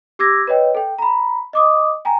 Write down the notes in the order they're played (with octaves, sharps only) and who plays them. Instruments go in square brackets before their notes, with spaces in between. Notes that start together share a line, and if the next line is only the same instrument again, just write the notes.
[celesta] G4 D6 E6 G#6 A#6
B4 C#5 D#5 G5
A4 G5
A#5 B5
D#5 D6 D#6
G5 G#5 A#5